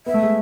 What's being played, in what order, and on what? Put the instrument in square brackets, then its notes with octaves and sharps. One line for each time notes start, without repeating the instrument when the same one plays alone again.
[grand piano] B3 [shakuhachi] E5
[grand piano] A3
G#3